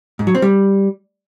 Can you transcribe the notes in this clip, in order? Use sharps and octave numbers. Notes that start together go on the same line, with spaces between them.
G#2
F#3
C4
G3